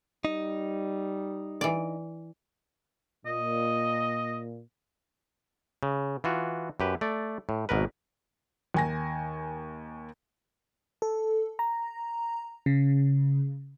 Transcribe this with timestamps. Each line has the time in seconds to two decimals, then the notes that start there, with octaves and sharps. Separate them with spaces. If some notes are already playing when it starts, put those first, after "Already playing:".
0.25 G3 D#4
1.61 E3 D5
3.26 A#2 D#5
5.83 C#3
6.24 E3 F4 F#4
6.80 F#2 G4 B4
7.01 A3 D5
7.49 A2
7.69 G#1 B2 A#4 B4
8.74 D#2 G#5 A#6
11.02 A4
11.59 A#5
12.66 C#3